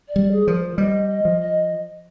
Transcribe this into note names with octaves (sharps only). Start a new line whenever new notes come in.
D5
G3
G#4
F3 A#4
C5
G3 D#5
D#5
F3
D#5